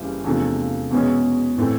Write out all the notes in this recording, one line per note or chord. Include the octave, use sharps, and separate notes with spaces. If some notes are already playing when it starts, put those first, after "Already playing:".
Already playing: F#1 C#3 E3 G3
E2 C3 F3 A3 D4
E2 B2 G#3 C#4
A2 E3 A3 C4